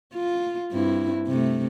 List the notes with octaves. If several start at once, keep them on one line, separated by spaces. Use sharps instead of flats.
F4
G2 C4 E4
C3 A3